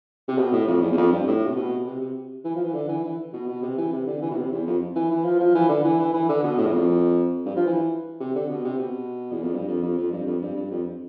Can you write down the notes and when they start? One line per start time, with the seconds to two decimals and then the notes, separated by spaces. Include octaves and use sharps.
0.28 C3
0.38 B2
0.53 A2
0.67 F2
0.82 E2
0.92 E2
0.97 F2
1.12 G2
1.27 A2
1.46 C3
1.56 B2
1.86 C3
2.01 C3
2.44 E3
2.55 F3
2.64 E3
2.74 D3
2.88 E3
3.03 E3
3.33 B2
3.48 B2
3.62 C3
3.78 E3
3.92 C3
4.06 D3
4.22 E3
4.31 B2
4.36 C3
4.51 E2
4.66 F2
4.96 E3
5.11 E3
5.24 F3
5.39 F3
5.54 E3
5.69 D3
5.84 E3
5.99 E3
6.13 E3
6.29 D3
6.43 B2
6.58 A2
6.66 E2
6.73 F2
7.46 G2
7.56 F3
7.66 E3
8.20 C3
8.35 D3
8.49 B2
8.64 C3
8.78 B2
9.32 E2
9.42 F2
9.53 G2
9.67 F2
9.82 F2
9.97 F2
10.11 G2
10.26 F2
10.41 G2
10.56 G2
10.70 F2